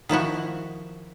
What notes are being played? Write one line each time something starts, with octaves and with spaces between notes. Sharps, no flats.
D#3 F3 E4 F#4